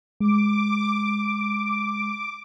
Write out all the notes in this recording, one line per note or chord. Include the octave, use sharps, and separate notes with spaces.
G#3 D6